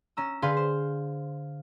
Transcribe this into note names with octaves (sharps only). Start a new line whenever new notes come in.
C#4 A#5 E6
D3 G#4 B4 F5 C6 G6
C5